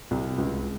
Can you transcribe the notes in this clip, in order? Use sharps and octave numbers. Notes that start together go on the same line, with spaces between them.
C2
C#2